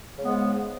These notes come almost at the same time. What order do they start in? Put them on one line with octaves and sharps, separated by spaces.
C#3 G#3 B3 G#2